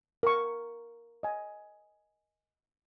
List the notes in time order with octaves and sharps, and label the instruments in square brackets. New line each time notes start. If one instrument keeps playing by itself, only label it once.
[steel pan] A#4 C#6
D#5 G#5